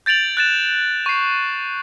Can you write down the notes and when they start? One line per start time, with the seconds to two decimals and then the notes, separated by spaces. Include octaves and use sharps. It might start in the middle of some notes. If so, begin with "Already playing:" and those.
0.06 G6 A6 D7 F7 F#7
0.37 F#6 A6 E7
1.06 C#6 C7